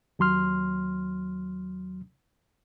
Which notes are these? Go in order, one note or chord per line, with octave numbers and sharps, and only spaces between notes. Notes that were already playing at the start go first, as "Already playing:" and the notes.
D#2 F#3 C6 F6